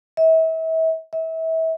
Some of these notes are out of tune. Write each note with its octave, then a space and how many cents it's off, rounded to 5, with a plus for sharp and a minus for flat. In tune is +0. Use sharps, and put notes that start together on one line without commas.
E5 -35
E5 -30